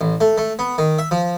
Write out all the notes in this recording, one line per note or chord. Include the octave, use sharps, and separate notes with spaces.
A1
A3
A3
B3
D#3
E5
F3